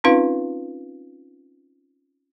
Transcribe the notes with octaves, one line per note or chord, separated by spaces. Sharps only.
C4 C#4 D#4 F4 B4 F5